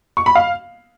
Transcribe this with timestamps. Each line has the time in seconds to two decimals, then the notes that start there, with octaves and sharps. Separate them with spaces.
0.17 C#6
0.26 B5
0.35 F5